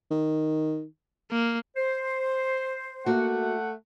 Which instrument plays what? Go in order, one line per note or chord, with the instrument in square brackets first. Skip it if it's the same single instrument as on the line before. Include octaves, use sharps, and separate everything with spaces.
[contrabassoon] D#3
[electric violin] A#3
[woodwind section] C5
[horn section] A3 F#5 [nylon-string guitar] A#3 F#4